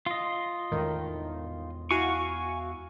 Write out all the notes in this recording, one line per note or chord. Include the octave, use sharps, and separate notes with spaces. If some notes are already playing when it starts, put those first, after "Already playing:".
F4 D#5
E2 A2 D#3 G#3 C#4
E4 F#4 F5 G#5 C#6